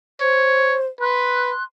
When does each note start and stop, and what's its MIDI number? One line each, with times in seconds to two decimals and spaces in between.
0.21 0.86 72
0.21 0.77 73
1.00 1.52 71
1.00 1.63 84
1.00 1.63 90